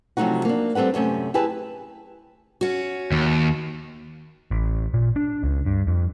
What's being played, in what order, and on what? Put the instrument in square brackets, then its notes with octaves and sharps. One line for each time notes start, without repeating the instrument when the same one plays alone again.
[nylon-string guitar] C3 F3 F#3 A3 D#4 F#4
A#3 D4
G3 C4 A4 B4 F#5
F#2 C3 A3 C#4
E4 G4 G#4 B4 A5
[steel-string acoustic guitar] C#4 F#4
[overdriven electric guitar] D#2
[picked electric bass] A1
A#2
D4
C#2
G2
F2